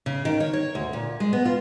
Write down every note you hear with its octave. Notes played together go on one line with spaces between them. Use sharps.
C#3
D#3
C#5
C#5
D2
A#2
G#3
B3
F4